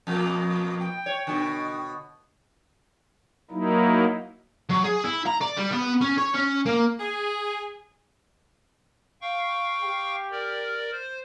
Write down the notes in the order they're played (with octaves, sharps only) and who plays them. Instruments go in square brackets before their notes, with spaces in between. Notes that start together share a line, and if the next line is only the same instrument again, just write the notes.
[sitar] F2 B2 A#3
[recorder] G5
[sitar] C#5
B2 D3
[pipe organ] F#3 A#3 D#4 E4
[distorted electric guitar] F#3
G#4
E4
A#5
D5
G3
B3
C#4
C#5
C#4
A#3
[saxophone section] G#4
[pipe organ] F5 G5 C#6
[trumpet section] G4
[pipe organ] A#4 D5
C5